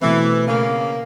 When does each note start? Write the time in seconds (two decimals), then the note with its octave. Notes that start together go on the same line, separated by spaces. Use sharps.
0.02 B2 E3 A3 C4
0.47 C#3 A#3